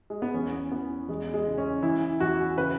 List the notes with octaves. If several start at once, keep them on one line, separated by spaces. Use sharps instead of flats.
G#3
B3
E2 C#4
E3 B3
E2 G#3
G#3
C#3
C#4
E3 E4
E2 F#4
C#3 B4